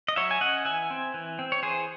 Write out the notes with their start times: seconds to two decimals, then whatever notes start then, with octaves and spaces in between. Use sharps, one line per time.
0.08 D#5
0.16 F#3 C#5 E5
0.31 G#5
0.41 C#4 D#5 F#5
0.65 E3 E5 G#5
0.91 C4
1.14 E3
1.39 C4
1.52 C#5
1.63 E3 G#4 C5